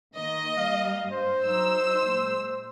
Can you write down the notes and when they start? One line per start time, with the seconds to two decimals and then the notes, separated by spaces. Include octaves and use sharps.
0.16 D#3 A#3 D#5
0.57 G3 A#3 F5
1.11 G2 C5
1.45 F#3 D#4 E6
2.08 A#2 G#3